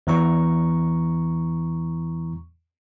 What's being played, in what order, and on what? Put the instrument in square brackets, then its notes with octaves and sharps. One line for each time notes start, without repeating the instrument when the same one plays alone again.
[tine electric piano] E2 E3 A#5 C#6